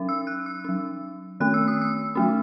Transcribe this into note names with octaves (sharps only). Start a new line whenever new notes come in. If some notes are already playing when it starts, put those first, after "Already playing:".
Already playing: F#3 C#4
E6
F#6
E6
F#3 C#4
D#3 A3 C#4 F#6
E6
D#6
E6
F#3 A3 C#4